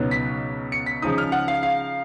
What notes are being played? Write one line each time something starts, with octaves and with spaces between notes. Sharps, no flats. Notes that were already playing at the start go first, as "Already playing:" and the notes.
Already playing: C#2 B2 F#3 B3 D#4
B6
C#7
B6
C#3 F3 G#3 D#4 D#6
F6
F#5
F5
F5